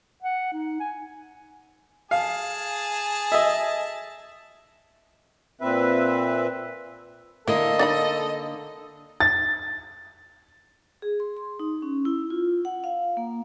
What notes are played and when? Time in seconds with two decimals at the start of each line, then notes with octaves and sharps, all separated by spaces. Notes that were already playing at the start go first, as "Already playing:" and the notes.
0.22 F#5
0.53 D#4
0.80 G#5
2.11 G#4 F5 A5
3.32 D#5 E5
5.61 A#2 C4 B4 E5
7.48 D3 A#3 E4 A4 D#5
7.79 D4 D#4 B5
9.20 A6
11.02 G#4
11.20 C6
11.37 C6
11.60 D#4
11.82 C#4
12.05 E4
12.30 F4
12.65 F#5
12.84 F5
13.17 A#3